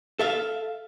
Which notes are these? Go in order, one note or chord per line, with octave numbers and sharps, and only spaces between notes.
A4 E5 F5